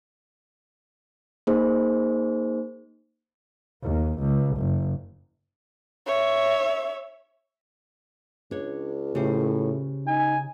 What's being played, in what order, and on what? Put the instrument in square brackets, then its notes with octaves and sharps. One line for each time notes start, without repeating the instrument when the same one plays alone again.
[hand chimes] A#3 D#4 G#4 C5
[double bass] D#2
C#2
F#1
[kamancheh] C#5 E5
[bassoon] C#2 [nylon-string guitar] D4 C#5
[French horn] A2 [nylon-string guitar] C#3 G4 C5
[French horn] D#4 [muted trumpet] G#5